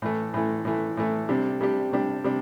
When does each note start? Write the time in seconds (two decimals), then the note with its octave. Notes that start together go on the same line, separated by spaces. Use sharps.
0.02 A2 E3 A3
0.34 A2 E3 A3
0.65 A2 E3 A3
0.97 A2 E3 A3
1.29 C3 G3 D4 G4
1.61 C3 G3 D4 G4
1.93 C3 G3 D4 G4
2.24 C3 G3 D4